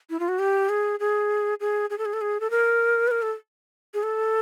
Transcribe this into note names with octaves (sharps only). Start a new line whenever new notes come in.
E4
F4
F#4
G4
G#4
G#4
G#4
G#4
A4
G#4
A4
G#4
A4
A#4
B4
A#4
A4
G#4
A4